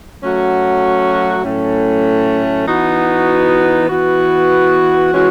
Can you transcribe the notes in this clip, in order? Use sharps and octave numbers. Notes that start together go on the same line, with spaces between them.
F#3 A3 C#4 F#4
A2 F#3 A3 C#4
E3 B3 D#4 F#4
E3 B3 F#4
E3 G#3 C#4 F#4